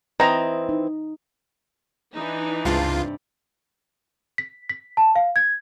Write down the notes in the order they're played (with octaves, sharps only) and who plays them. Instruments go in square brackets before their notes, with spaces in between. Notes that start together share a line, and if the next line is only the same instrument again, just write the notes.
[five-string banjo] E3 C4 [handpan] D#5 [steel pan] A#5
[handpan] D#4
[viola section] E3 D4 D#4
[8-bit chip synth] C#2 F4 [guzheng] G2 C3 D5
[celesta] B6
B6
A5
F5
G#6